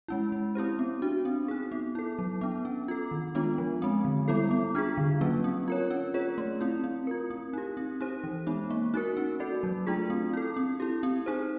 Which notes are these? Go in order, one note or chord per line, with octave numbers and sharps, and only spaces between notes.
G#3 C#4 E4
G#3
C4 E4 G4 C5
B3
D4 F#4
C4
D#4 G#4
B3
E4 A4
F#3
B3 D4
C#4
F4 A4
D#3
G#3 B3 D4 F4
F3
G#3 C4
D3
G3 B3 E4 A4
B3
D4 F4 G#4
D3
F#3 A#3 C#4
C4
F4 A#4 C#5
C#4
F4 G#4 C#5
A3
C4 E4
C4
F4 A#4
C4
D#4 G4
C4
D#4 G4 C5
E3
G#3 B3 D#4
A#3
D#4 F#4 A#4
C#4
F#4 A4 D5
F#3
A3 D4 F4 G#4
C4
E4 A4
C4
E4 G4
C4
D#4 G#4 C5